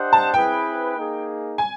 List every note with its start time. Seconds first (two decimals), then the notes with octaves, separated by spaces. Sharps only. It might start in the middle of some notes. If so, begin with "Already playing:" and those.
Already playing: D4 G4 C5 D#5 F#5
0.13 A5
0.34 C4 E4 G#4 B4 G5
0.97 A#3 D#4 G#4
1.58 G#5